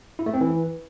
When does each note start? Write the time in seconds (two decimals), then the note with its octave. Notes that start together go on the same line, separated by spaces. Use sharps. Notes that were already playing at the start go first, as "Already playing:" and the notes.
0.19 E4
0.26 A3
0.34 C4
0.41 E3